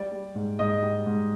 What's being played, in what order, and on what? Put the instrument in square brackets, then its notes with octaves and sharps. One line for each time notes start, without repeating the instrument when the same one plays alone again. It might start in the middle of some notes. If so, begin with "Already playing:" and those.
Already playing: [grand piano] G3 D5
G3
G#2
G#2 D#5
G3
G#2